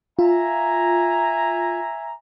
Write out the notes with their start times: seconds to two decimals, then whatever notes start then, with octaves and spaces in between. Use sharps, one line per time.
0.19 F4 E5 G#5 A#5